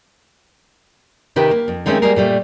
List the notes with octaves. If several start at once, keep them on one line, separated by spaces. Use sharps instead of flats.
C3 D#3 G4 B4
A#3
F2
D#3 G#3 A3 C4 C#4
G3 G#3 A#3 G#4 A#4
A#2 G3 A3